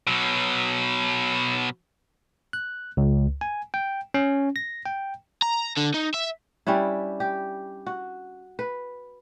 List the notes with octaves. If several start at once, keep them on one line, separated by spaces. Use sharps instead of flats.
B2 F#3
F#6
C#2
G#5
G5
C#4
A#6
G5
A#5
D3
D#4
E5
G3 C#4 D4 E4
G4
F#4
B4